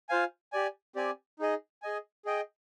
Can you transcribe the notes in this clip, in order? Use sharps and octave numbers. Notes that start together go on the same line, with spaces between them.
F4 C5 F5 G#5
G4 D5 G#5
C4 G4 D5 G#5
D#4 G#4 D#5
G#4 D#5 G#5
G#4 D#5 G5